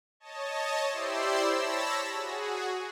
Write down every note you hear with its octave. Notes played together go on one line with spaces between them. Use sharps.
C#5 D#5 A5
E4 G4 C5 D5 C6 E6
C#5 A5 B5 E6 A#6
F#4 G#4